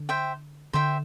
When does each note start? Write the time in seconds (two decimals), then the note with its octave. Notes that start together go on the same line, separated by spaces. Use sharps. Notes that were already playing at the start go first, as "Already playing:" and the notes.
Already playing: D3
0.09 C5 E5 G5
0.73 D3 C5 E5 G5